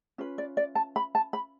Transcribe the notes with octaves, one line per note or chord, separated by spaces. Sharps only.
C#4 F4 B4
D5
D5
A5
B5
A5
B5